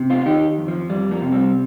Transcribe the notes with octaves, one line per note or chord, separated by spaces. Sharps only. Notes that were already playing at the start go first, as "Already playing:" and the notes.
Already playing: C3
C4 F4
D#3 D#4 G4
F2
F3
F2 G3
F3 A#3
C3
G3 C4